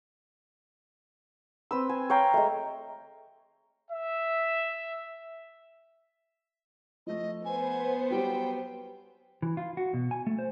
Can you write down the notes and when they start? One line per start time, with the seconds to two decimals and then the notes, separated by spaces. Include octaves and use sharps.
1.71 C4 B4 E6
1.89 G#5
2.10 C#5 F5 G5 A#5
2.34 G#3 A3
3.91 E5
7.07 F3 A3 D#5
7.45 B3 C5 G#5
8.10 F#3 G3 G4 G5
9.42 E3
9.57 F4
9.77 F#4
9.94 B2
10.11 G#5
10.27 A3
10.39 C5